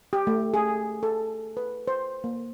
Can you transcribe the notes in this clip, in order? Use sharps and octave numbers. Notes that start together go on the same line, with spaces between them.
G4
A3
G#4
A4
B4
C5
A#3